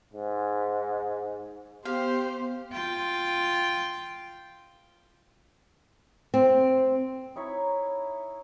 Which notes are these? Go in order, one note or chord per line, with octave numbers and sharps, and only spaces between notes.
G#2
B3 G4 C5 F5
F4 G5
C4
D#4 E4 C#5 B5